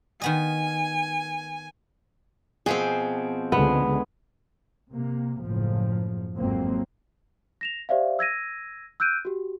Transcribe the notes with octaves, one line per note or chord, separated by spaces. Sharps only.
D#3 B3 D#5 G#5
B2 F3 C4 G#4
C#2 D3 G#3 B3
C3 A#3
F#1 A2 F3
G#1 F2 F#3 A#3 C4
A#6 E7 F7
G4 C5 D5 E5 F5
E6 G#6 A#6 D#7
E6 F#6 G6 D7 D#7
F#4 G4